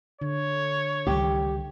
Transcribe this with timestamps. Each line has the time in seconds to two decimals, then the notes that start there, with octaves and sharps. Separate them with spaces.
0.21 D3 C#5
1.07 C#2 D#3 G3 G4